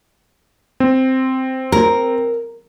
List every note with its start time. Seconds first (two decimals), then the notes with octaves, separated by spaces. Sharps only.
0.80 C4
1.72 A#4